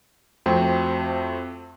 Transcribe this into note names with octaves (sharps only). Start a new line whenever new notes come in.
F2 A3 C4 F#4 G5 C6